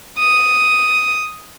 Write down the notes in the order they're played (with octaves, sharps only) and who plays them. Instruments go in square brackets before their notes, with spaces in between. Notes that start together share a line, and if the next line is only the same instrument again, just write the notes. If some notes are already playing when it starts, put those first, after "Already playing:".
[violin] D#6